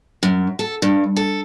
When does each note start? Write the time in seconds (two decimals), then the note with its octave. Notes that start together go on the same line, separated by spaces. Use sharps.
0.23 F#2
0.59 A4
0.82 G2
1.16 A4